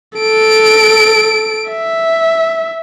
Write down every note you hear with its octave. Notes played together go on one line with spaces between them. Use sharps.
A4 D7
E5